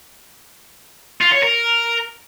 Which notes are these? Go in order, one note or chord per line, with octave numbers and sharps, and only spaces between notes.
F4
C#5
A#4